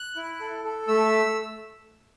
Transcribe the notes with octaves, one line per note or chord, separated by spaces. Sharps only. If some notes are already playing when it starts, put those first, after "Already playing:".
Already playing: F#6
E4
A4
A4
A3 E6